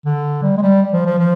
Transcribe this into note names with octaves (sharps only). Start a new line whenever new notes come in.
D3
G3
G#3
G3
F3
F3
F3